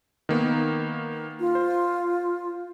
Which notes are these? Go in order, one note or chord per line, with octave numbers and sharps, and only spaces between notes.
D#3 A#3 B3
F4
C5